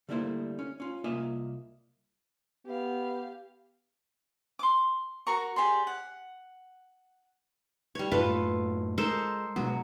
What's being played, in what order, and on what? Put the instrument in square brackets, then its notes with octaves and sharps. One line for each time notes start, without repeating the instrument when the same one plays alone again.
[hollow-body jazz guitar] D3 G3 A3 A#3 E4 C5
C#4
C#4 F4
C2 A#3 F4 D#5 E5 G#5
[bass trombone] B3 [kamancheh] G4 F5
[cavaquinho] C6 D6
F#4 A#4 A#5 C#6
G4 G#4 D5 C6
F#5
[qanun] G3 C#5
[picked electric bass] F#2 A2 A3 [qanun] F4 A4 B4
[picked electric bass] G#3 [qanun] A4 A#4 C5
[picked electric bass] B2 G#3 B3 [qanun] F#3